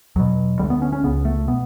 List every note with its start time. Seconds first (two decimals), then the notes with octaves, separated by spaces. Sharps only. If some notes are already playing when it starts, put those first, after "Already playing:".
0.16 E2 B2 F#3
0.59 D2 D3 G3
0.70 B3
0.82 C#4
0.92 C#4
1.04 C#2 C#3 B3
1.25 A3
1.48 B2 B3